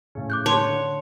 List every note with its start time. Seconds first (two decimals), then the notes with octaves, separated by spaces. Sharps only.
0.15 A2 C#3
0.30 D6 F#6 G6
0.46 C#5 A5 C6
0.64 D3